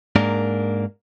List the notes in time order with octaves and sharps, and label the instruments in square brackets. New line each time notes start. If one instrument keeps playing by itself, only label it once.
[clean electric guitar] G#2 A#3 D4 A#4